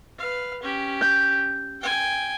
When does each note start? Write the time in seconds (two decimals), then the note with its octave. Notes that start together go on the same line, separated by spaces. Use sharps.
0.18 B4 F5
0.63 C#4 G4
1.01 G6
1.81 G5 G#5